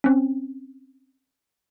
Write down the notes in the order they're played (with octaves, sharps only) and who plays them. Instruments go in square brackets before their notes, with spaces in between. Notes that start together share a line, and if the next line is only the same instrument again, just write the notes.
[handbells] C4 C#4